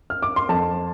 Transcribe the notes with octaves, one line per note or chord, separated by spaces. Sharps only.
F6
D6
C6
F2 A5